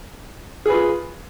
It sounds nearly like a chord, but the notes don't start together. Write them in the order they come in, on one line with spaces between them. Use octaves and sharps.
G#4 B4 F4